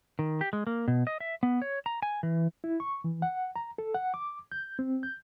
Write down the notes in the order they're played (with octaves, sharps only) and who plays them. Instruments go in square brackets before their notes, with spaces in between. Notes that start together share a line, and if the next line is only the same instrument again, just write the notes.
[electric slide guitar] D#3
G4
G#3
A#3
B2
D#5
E5
B3
C#5
A#5
G#5
E3
[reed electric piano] E4
C#6
E3
F#5
A#5
A4
F#5
D6
G6
C4
G6